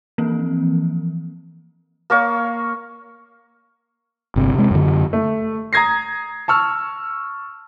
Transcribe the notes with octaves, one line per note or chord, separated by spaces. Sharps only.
E3 F3 A#3 C4
A#3 A#4 C#5 F5
G1 C3
C3 G#3
F#2 D3
A3
A#5 D#6 G#6 A#6 C7
A5 C#6 E6 F6